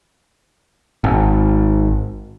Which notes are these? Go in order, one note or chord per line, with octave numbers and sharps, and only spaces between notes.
G#1